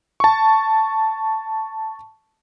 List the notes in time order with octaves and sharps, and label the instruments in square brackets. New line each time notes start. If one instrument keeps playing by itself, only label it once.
[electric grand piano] A5 C#6